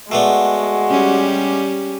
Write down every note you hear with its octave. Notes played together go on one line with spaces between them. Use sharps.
G#3 A3 B3 D4 F#4
G3 C#4 G4